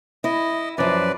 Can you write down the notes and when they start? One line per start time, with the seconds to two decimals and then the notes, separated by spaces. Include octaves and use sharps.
0.24 E4 D#5
0.78 F#2 F3 B4 D5